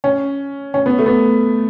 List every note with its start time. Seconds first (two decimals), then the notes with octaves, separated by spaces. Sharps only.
0.04 C#4
0.74 C#4
0.86 B3
0.99 A3
1.06 B3